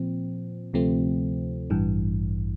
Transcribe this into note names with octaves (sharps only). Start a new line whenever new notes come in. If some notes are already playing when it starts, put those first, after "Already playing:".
Already playing: A#2 F3 C4
D2 C3 F3 A3 C4
A1 G2 E3